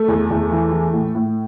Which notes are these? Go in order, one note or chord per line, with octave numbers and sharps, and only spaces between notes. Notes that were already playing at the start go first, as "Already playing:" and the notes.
Already playing: A3
E2
E2
E3
E3
A2
A2